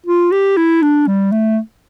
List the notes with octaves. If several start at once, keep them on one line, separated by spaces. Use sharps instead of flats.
F4
G4
E4
D4
G3
A3